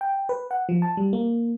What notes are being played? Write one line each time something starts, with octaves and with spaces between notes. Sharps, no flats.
G5
B4
F#5
F3
A5
G3
A#3